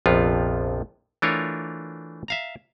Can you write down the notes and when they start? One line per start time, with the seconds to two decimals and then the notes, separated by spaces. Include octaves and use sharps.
0.06 A#1 F2 C3 F3 B3 F4
1.22 E3 A3 D4 F4 A#4 C#5
2.28 E5 F5 A#5